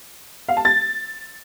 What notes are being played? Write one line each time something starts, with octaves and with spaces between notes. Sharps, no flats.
F5
A5
A6